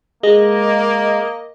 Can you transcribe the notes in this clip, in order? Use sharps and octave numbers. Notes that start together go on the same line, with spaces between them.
G#3 A#3 D#5